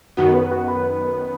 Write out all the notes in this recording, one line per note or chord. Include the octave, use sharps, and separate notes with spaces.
F#2 D#3 B3 F#4
B4
F#4
B4